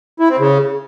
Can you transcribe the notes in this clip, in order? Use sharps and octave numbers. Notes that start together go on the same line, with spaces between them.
E4
C4
C#3